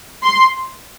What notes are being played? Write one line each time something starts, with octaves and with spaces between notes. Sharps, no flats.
C6